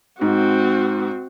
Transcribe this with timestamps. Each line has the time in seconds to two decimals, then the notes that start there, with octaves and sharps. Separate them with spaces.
0.21 G#2 C4 F#4